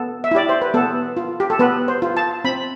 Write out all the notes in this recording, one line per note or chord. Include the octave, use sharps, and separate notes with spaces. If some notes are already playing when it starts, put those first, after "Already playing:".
Already playing: B3 A4
E5
E4 G4 D5
C5
B4
B3 A4
F4
G4
A4
B3 B4
C5
F4
A5
C4 B5